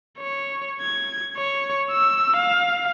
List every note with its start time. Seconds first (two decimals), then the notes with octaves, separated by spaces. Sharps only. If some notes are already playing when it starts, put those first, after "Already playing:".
0.19 C#5
0.81 G#6
1.37 C#5
1.91 E6
2.36 F5